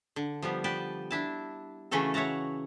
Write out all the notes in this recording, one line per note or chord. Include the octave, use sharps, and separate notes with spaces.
D3
F3 G3 B3
B4 D5 G5 A5
D4 E4 A5
C#3 E3 A3 F#4 A4
C#5 E5 F#5 A5 A#5